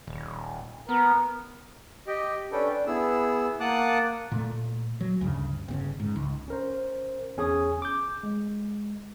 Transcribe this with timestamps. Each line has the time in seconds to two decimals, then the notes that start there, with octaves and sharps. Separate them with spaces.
0.07 D#1
0.89 B3 A#4
2.07 G4 D#5 G5
2.52 C#4 D4 A4 B4 G5
2.71 D4
2.87 B3 E4 G#4 E6
3.60 A#3 F#5 A5 D6 D#6 F#6
4.31 A#2 A3
5.01 F#3
5.21 D2 G2 C#3
5.68 G1 A#2 C#3
6.00 G#2
6.16 C#2
6.48 C#4 A#4 C5
7.37 E2 C#4 G#4 G#5 D#6
7.82 D6 G6
8.23 G#3